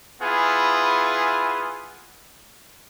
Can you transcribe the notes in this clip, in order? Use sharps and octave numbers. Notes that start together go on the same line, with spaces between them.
B3 E4 F4 G#4